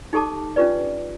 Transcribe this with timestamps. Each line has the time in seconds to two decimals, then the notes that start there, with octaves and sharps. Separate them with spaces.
0.13 D#4 G4 A4 A5 D6
0.56 C#4 D4 F4 G4 B4 D5